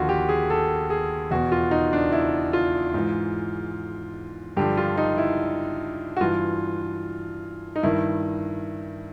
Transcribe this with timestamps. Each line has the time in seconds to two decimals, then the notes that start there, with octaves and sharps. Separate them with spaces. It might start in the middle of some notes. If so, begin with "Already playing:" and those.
Already playing: D#2 D3 F3 F4 F#4
0.09 G4
0.29 G#4
0.50 A4
0.90 G#4
1.31 E2 B2 F#4
1.52 F4
1.71 D#4
1.93 D4
2.12 E4
2.53 F4
2.94 G#2 E3
4.57 G2 D3 F3 G4
4.77 F4
4.97 D#4
5.18 E4
6.17 F#4
6.21 G2 E3 F4
7.76 D#4
7.83 G2 D#3 E4